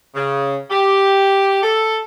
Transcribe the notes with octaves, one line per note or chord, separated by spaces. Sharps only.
C#3
G4
A4